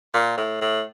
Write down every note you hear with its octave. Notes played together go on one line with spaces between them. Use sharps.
A#2
A2
A2